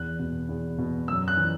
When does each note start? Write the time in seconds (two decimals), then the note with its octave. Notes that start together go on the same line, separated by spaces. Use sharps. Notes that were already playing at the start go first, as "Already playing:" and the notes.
Already playing: E2 F#6
0.19 B2
0.49 E2
0.78 B2
1.08 F#2 E6
1.28 F#6
1.37 E3